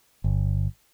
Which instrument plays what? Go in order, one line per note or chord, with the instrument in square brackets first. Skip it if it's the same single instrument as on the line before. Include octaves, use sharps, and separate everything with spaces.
[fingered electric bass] G1